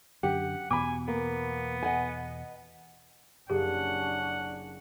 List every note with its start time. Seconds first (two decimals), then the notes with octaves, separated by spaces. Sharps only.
0.23 F#2 D3 G4 F#5
0.71 E2 B2 G#5 B5 D6
1.08 A#3 B3
1.83 D#5 F#5 G#5
3.50 F#1 C#4 D4 G4 G#4 F#5